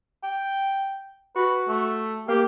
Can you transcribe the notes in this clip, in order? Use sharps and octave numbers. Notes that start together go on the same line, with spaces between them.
G5
F#4 B4
A3
A#3 G4